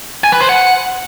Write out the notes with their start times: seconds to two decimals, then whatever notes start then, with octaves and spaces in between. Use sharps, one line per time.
0.24 G#5
0.32 B4
0.41 C5
0.49 F#5